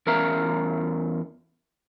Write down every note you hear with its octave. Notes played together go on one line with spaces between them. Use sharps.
E2 C#4 A#4 E5 F5 A#5